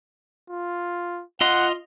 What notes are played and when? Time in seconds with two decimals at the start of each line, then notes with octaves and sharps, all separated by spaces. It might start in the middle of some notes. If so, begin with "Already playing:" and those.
0.50 F4
1.41 F4 D#5 F#5 C6